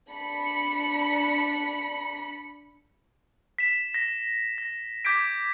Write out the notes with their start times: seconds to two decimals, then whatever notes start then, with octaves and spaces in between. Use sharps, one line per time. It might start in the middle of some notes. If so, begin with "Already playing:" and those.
0.11 D4 B5 C#7
3.59 B6 E7
3.94 A#6 B6
4.58 A#6
5.05 D6 G6 G#6 B6 D7